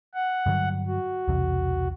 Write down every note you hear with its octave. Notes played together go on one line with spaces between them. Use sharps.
F#5
G2 D3 F#3
F#4
B1 E2 C3